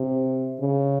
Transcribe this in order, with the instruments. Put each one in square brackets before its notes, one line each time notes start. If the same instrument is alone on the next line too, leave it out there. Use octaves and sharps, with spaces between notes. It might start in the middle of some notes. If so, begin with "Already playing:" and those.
Already playing: [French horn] C3
C#3